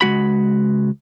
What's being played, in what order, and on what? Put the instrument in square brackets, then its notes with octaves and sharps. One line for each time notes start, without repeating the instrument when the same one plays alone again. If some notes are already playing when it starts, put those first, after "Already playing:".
[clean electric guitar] C#2 G#3 F#4 B5